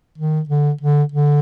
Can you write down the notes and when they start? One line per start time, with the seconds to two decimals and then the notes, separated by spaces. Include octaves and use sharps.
0.18 D#3
0.49 D3
0.81 D3
1.12 D3